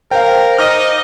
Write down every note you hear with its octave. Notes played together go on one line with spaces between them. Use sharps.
A#4 C5 F5 G5
D#4 D#5 D6 F6